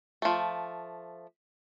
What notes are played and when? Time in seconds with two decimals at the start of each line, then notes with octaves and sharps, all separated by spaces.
0.22 F3 A3